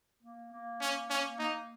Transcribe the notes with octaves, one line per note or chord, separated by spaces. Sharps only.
A#3
A#3
C#4
C#4
A#3 D#4